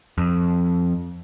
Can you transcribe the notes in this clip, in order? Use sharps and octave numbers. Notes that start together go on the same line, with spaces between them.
F2